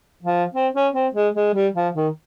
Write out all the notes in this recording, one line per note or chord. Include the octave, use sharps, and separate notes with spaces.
F3
C4
C#4
C4
G#3
G#3
G3
F3
D#3